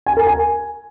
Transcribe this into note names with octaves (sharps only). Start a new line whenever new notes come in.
G#5
A#4
G#5